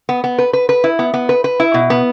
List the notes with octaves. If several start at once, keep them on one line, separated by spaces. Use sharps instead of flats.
B3
B3
B4
B4
B4
E4
B3
B3
B4
B4
E4
B2
B3